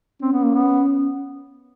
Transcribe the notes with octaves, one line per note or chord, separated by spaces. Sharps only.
C4 C#4
B3
A#3
B3